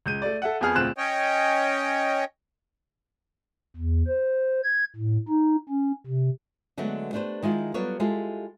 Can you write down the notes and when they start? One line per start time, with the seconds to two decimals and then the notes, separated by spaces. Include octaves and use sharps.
0.06 C#2 G6 D#7
0.22 A3 D5
0.42 A4 E5 F#5
0.61 F2 B3 G#4 F6
0.74 E1 D2 C4 F4 F#6 E7
0.96 C#4 C#5 D#5 G5
3.76 E2
4.07 C5
4.64 G#6
4.96 A2
5.28 D#4
5.69 C#4
6.07 C3
6.77 D3 F#3 G#3 A3 B3
7.13 A3 D4 G4 B4 C5
7.42 D#3 G#3 E4 F4
7.74 F#3 G3 B3 F4 A4 C#5
8.00 G#3 E4 F4 G4 A4